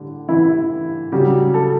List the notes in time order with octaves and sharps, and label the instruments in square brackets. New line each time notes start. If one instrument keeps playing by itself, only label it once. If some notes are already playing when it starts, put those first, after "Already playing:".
Already playing: [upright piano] A2 D3 G3
E3 E4
C#3 F#3 G3 G4
A4